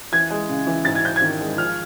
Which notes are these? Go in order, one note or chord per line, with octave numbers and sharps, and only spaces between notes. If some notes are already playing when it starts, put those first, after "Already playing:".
E3 G#6
G#3
C#3
E3
G#2 A6
G#6
G#2 G6
G#6
D#3
G#3
F3 F6